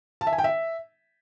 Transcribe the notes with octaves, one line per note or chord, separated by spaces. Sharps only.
A5
E5
G#5
G5
E5